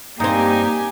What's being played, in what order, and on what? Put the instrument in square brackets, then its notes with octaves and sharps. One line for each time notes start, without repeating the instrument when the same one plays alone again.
[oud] G2 C4 [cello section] A#3 [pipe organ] D#4 [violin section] G4 G#5